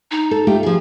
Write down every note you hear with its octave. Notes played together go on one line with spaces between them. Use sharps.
D#4
A4
A3 F4 G4
F3 F4 G#4